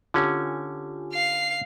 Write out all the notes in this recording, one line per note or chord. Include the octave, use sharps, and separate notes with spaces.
D3 C#4 F4 G4 G#5
F5 C7